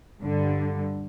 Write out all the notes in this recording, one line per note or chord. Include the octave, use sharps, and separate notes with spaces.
G2 D3